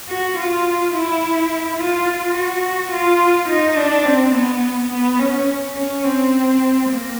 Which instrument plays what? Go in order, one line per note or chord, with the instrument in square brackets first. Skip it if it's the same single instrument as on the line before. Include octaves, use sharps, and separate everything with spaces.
[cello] F#4
F4
E4
F4
F#4
F4
D#4
D4
C4
B3
B3
C#4
C#4
C4
A#3